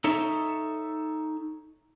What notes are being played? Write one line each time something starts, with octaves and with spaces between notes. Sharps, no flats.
D#4 A4 C#5 E5